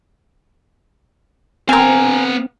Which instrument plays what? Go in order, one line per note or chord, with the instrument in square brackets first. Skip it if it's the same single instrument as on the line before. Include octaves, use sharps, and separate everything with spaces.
[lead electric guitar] B3 F5 [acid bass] C4 [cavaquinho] A#4 G#5